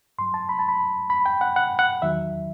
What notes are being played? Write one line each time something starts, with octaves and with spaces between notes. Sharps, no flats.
G2 F#3 C6
A5
B5
A5
B5
B5
G5
F#5
F#5
F#5
E2 D#3 F#3 E5